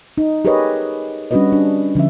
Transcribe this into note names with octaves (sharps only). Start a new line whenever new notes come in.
D#4
G4 G#4 A#4 B4 C#5 D#5
G3 C#4 D4 F#4 B4 D#5
D4
D3 F3 C#4 E5